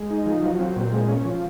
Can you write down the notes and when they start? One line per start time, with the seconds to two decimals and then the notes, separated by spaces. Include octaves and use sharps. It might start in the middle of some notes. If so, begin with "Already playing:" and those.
Already playing: G#3
0.10 D#4
0.26 F3
0.43 F#3
0.59 C4
0.76 A#2
0.92 G#3
1.08 C#4
1.25 F3